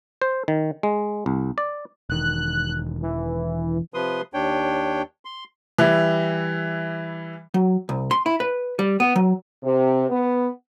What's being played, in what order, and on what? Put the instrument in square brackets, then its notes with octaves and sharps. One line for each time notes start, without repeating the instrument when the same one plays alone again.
[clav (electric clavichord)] C5
D#3
G#3
C2
D5
[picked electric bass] E1 D#3 [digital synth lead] F#6
[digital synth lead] E3
[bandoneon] C3 F3 B4 C6 D#6
D#2 D4 C#5 G5
C6
[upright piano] E3 G3 E4
[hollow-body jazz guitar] F#3
C2
C6
E4
B4
G3
B3
F#3
[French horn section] C3
B3